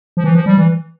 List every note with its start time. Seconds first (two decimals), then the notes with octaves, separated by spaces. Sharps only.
0.17 F3
0.24 E3
0.35 F3
0.46 G3
0.58 E3